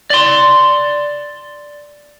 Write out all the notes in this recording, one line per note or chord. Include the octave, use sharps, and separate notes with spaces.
D5 C6